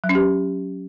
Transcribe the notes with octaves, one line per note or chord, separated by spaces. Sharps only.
F#3
C#4
G4